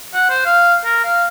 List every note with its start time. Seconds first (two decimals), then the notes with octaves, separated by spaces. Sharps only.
0.14 F#5
0.30 C5
0.46 F5
0.85 A#4
1.04 F5